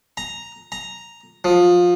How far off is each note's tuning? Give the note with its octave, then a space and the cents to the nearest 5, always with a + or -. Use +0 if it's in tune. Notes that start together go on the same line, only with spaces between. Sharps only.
A#5 +0
A#5 +0
F3 +20